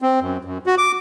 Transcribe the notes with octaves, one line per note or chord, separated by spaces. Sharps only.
C4
F#2
F#2
F#4
D6